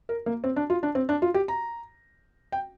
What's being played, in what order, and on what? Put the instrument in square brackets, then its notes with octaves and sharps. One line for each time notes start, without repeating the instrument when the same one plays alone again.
[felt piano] A#4
A#3
C4
D4
F4
D4
C4
D4
F4
G4
A#5
G5